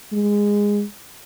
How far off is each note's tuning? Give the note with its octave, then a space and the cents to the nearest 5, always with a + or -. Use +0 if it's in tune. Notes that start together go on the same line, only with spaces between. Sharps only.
G#3 -15